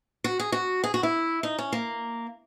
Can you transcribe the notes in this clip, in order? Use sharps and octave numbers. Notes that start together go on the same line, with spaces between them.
F#4
G#4
F#4
G#4
F#4
E4
D#4
C#4
A#3